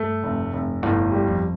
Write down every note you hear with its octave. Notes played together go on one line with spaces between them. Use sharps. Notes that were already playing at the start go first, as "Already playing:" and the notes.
Already playing: G2 A3
F1
F1
G1 A2
G3
F2